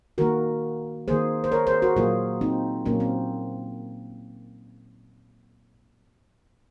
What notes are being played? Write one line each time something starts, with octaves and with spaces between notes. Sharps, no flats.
D#3 A#3 F#4 A#4
D#3 A#3 G#4 C5
C5
A#4 C#5
G#4 C5
F#4 A#4
A#2 F#3 A#3 F4 G#4
C4 D#4
A#2 F#3 A#3 C#4
C4